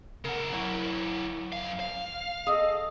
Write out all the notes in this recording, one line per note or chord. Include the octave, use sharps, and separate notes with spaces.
C#3 A#4 F#5
F#3 E4 C#5 F#5
F#2 F5
F5
G#4 A4 D#5